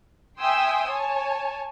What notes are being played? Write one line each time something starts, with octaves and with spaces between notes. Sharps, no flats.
E5 G5 G#5 C6 D#6 E6
C#5 G#5 A5